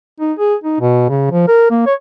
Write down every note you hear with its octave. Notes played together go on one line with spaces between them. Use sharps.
D#4
G#4
D#4
B2
C#3
F3
A#4
A#3
C#5